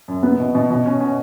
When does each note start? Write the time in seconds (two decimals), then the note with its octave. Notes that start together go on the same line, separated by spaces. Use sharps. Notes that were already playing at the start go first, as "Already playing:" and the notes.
0.08 F#2
0.23 B3
0.40 B2
0.55 B2
0.71 B2
0.86 C#4
1.01 C#4